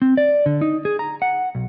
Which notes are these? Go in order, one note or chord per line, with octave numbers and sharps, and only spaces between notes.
C4
D5
D3
D#4
G#4
A#5
F#5
B1